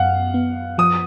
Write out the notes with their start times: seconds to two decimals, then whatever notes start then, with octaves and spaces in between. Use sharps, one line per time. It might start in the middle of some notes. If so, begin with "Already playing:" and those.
Already playing: F#2 B3 F5 F#5
0.34 B3
0.78 F3 D#6